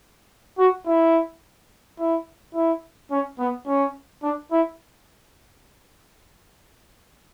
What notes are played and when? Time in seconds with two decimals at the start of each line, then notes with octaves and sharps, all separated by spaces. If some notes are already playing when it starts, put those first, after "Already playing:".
0.58 F#4
0.86 E4
1.98 E4
2.54 E4
3.11 C#4
3.39 B3
3.67 C#4
4.23 D4
4.51 E4